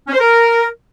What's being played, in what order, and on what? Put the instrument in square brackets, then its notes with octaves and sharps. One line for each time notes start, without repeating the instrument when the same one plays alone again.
[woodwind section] C#4
C5
A#4